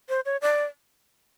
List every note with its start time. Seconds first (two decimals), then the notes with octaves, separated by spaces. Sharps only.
0.09 C5
0.26 C#5
0.42 D5